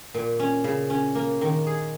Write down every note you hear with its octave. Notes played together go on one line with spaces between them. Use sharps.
A#2
C#4
C#3
C#4
A#3
D#3
G#4